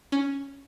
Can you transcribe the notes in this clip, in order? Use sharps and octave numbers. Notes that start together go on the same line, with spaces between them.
C#4